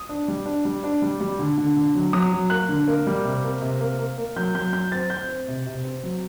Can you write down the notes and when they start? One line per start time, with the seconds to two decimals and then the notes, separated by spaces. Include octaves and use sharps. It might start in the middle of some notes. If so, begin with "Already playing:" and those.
Already playing: D#6
0.09 D4
0.28 G3
0.46 D4
0.65 G3
0.84 D4
1.02 G3
1.21 G3
1.39 D3
1.58 D3
1.77 D3
1.95 F#3
2.13 F#3 D#6
2.32 F#3
2.50 A#3 F#6
2.69 D3
2.88 A#3
3.07 G3
3.25 C3
3.44 A#3
3.62 C3
3.80 A#3
3.99 A#3
4.18 A#3
4.36 F#3 G6
4.55 F#3 G6
4.73 F#3 G6
4.92 C4 A6
5.10 C4 G6
5.29 C4
5.48 C3
5.66 C3
5.85 C4
6.03 F#3